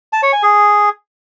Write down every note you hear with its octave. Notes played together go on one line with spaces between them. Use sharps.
A5
C#5
G#5
G#4